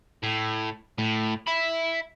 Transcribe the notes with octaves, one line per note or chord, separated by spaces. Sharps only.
A2
A2
E5 B5